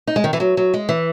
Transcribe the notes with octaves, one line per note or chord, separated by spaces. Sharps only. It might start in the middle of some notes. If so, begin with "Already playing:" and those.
D#4
G#3
D#3
E3
F#3
F#3
G#3
E3